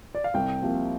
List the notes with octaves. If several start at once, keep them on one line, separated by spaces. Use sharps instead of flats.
D5
F5
C2 G5
C3 F3 A#3